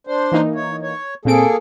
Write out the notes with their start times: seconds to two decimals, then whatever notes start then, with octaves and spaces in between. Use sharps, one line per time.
0.07 D4 C5
0.32 E3 A#3 D#4
0.55 C#5
0.82 C#5
1.25 A#2 A#3 C4 G#4 A4 D7